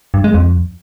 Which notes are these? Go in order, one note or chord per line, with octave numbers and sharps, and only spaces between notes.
G2
G#3
F2